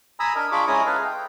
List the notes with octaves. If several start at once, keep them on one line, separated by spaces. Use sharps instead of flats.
G#5 A#5 B5 D#6 E6
D4 A#4 D#5
D4 F4 G#4 B5 C#6 D6
G#3 C#4 E4 G#5 A#5 D#6
G#4 A4 B4 D#5 F5
G5